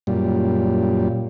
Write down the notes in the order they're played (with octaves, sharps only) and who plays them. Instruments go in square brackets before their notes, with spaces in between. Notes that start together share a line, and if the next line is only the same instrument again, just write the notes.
[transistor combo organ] F#2 A#2 G3